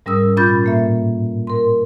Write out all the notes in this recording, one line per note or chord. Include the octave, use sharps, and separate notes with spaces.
G#2 G3 C#4 A#4 D#6 E6
A#2 C#4 F4 B5 G6 A6
A2 A#3 E5
A#4 C6